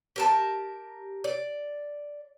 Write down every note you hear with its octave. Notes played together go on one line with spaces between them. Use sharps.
G4 A#4 A5
D5